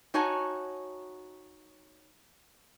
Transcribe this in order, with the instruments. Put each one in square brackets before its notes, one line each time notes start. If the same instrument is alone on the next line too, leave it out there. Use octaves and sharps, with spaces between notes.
[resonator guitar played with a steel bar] D#4 F#4 C#5 G#5 A5